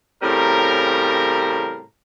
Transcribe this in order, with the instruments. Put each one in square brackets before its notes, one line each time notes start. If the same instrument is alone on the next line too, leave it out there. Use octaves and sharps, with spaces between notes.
[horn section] A2 C#3 G3 C4 A#4